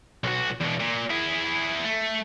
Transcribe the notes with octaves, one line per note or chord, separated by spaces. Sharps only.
B1 F#4
E2 B2
A#2
E4 G#4
A3